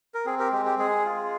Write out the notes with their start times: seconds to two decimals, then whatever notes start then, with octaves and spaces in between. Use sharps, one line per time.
0.14 A#4
0.26 C4 G#4
0.39 G4 A#4
0.52 G#3 G4
0.65 G4
0.79 G#3 G#4
1.05 F4